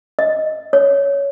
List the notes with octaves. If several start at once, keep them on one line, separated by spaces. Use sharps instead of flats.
D#5
C#5